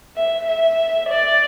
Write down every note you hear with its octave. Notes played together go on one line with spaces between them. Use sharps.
E5
E5
D5